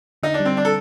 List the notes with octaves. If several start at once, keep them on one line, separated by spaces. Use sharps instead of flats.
D3 D#4
D4
G3
C4
D4
A4